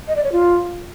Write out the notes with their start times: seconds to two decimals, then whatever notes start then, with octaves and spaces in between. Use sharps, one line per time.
0.08 D#5
0.16 D5
0.24 C#5
0.32 F4